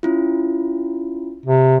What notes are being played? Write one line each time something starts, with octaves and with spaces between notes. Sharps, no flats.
C#4 E4 F4
C3